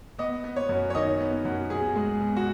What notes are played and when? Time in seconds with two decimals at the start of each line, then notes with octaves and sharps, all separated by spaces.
0.19 B3 D#5
0.44 B3
0.56 C#5
0.69 F#2
0.90 C#5
0.95 D#3 D#5
1.20 B3
1.45 F#2
1.70 B2 G#4
1.96 G#3
2.20 B2
2.36 F#4